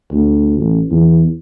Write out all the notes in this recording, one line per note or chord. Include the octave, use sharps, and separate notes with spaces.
D2
A1
E2